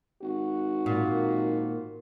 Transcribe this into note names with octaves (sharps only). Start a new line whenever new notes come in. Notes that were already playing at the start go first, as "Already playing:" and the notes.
G#1 F#4
A#2